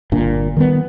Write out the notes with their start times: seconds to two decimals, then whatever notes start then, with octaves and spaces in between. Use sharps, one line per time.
0.12 G1 A#2 D4
0.57 D#3 G3 A3 B3